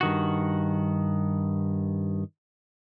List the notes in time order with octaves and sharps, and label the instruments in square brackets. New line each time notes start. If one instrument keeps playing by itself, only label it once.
[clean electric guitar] G2 D#3 F#4